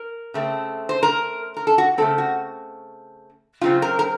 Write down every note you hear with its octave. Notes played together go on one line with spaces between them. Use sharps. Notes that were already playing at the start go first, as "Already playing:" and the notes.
Already playing: A#4
C#3 A3 C4
C5
A#4
A#4
A4
F#4
C#3 A3 C4 A4
F#4
C#3 F#3 C4 F4
A#4
A#4